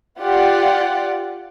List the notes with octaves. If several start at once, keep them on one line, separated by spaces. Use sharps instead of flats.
F4 G4 D5 F#5